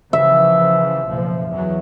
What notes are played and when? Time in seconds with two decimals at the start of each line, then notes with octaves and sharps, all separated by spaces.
0.13 C#3 E3 F3 E5
1.07 F#1 B1 F3
1.50 E2 E3 F#3